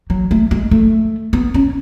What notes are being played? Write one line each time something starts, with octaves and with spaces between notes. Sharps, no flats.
F#3
A3
G#3
A3
B3
C#4